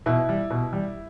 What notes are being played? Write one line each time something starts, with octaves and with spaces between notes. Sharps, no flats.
B2 E4
G3
B2
G3